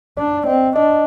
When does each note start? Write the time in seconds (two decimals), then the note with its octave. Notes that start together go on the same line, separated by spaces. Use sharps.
0.17 D4 D5
0.46 C4 D#5
0.76 D4 D#5